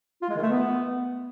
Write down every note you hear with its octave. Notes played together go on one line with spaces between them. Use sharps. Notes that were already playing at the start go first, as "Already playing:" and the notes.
F4
G#3
D#3
A3
B3